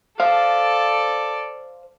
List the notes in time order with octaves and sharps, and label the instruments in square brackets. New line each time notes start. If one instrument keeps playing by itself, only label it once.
[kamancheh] A4 D5 [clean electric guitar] C5 F5